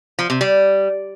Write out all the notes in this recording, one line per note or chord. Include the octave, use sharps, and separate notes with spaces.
F3
C3
G3